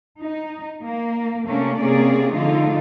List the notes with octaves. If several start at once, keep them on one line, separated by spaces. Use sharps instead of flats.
D#4
A#3
C3 A3 A#3 C#4 D4
C3 A#3 C#4 G#4 D5
D3 F3 A3 D#4 F4